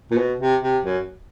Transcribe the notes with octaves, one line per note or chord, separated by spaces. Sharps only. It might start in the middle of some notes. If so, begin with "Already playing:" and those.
A#2
B2
C3
C3
F#2